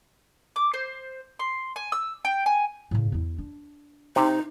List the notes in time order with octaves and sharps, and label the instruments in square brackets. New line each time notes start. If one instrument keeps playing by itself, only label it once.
[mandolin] D6
C5
C6
G#5
E6
G5
G#5
[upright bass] A2 C#3
E2 E4
D4
[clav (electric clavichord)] C3 [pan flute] D#4